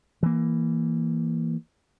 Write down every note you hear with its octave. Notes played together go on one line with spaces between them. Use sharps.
E3 A#3